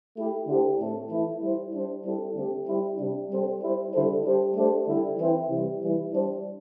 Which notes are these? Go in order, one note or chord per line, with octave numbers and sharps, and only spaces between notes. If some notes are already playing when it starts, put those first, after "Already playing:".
A3 E4 G4
D3 A3 E4 G4 C5
A2 A3 C4 A4
E3 A3 E4
G3 E4 C5
G3 D4 C5
G3 C4 E4 A4
D3 A3 C4 G4
G3 E4 G4 C5
C3 G3 D4
G3 C4 A4 C5
G3 E4 C5
D3 G3 E4 A4 C5
G3 D4 G4 C5
A3 D4 G4 C5
D3 G3 E4
E3 C4 E4 C5
C3 E3 G3
E3 G3 E4
G3 D4 C5